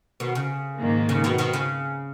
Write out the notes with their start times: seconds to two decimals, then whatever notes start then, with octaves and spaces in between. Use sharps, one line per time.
0.20 B2 D#3
0.35 C#3
0.80 G#2 D#3 A#3
1.09 C#3
1.24 B2 D#3
1.38 B2 D#3
1.53 C#3